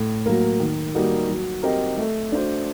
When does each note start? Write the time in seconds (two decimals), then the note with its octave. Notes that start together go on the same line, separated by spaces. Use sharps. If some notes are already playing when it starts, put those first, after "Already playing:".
Already playing: A2
0.26 F#3 A#3
0.60 D#3
0.94 G3 A#3 D#4 F#4
1.28 F#3
1.63 C4 G4 A#4 D#5
1.97 A3
2.32 D4 F#4 C5